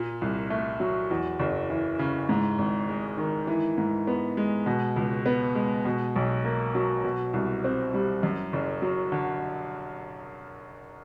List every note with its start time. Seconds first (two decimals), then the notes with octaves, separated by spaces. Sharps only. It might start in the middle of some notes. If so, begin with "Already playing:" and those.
Already playing: A#2
0.21 C2
0.50 A3
0.80 F#3
1.10 E2
1.40 F#1
1.70 E3
1.99 C#3
2.29 G#2
2.58 G#1
2.89 G#3
3.18 D#3
3.47 E3
3.78 G#2
4.07 B3
4.37 G#3
4.66 B2
4.96 C#2
5.26 B3
5.55 G#3
5.85 B2
6.16 B1
6.44 A#3
6.75 F#3
7.04 B2
7.33 C2
7.64 C4
7.94 G3
8.23 F#2
8.53 F#1
8.82 F#3
9.12 D3